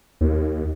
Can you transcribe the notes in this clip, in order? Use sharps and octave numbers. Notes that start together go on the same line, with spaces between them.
D#2